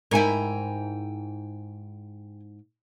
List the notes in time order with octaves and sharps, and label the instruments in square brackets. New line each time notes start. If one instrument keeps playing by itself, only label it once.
[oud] G#2 E4 [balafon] D#4 A#4 [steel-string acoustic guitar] G5 G#5 A#5